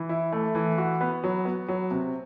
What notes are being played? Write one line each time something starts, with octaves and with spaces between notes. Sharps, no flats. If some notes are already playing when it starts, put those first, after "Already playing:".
Already playing: E3
E4
A3
E3
F#4
B3
F#3
B3
F#3
C3